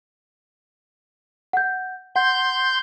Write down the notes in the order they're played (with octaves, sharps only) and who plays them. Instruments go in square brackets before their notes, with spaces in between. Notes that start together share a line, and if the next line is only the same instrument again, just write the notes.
[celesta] F#5 G6
[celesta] F#5 [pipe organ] C6 G6